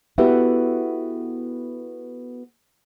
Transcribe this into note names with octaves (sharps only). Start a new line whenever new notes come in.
B3 E4 F#4 G4 A4 B4